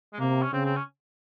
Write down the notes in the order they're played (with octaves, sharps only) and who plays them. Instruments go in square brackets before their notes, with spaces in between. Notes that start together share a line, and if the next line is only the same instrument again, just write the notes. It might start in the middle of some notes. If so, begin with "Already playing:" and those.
[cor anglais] G#3
[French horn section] C3 [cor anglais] A#3
[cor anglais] C#4
[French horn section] C#3 [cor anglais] C4
[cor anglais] C4
C#4